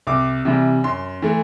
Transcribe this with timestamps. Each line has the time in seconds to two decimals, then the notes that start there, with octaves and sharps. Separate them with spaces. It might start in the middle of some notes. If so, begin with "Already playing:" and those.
0.07 C2 D6
0.45 C3 E3 G3
0.84 F#2 C6
1.22 E3 A3